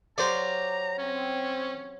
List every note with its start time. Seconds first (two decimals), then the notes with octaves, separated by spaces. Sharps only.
0.18 F#3 G4 C5 D5 F5 A#5
0.98 C4 C#4